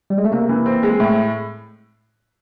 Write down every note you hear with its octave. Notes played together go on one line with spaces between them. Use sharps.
G3
G#3
A3
C3 A#3
E3
C4
G#3
A2 A3